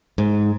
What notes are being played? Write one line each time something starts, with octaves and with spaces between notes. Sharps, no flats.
G#2